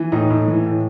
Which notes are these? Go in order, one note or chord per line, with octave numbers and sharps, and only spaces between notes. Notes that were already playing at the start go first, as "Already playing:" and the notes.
Already playing: E3
A2 D#4
A2
E3
A2